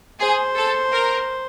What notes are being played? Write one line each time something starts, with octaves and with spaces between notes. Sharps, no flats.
G#4 C5
A4
A#4